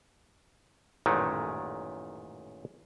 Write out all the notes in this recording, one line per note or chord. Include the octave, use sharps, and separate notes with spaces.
A1 F#2 A#2 D#3 G#3 A3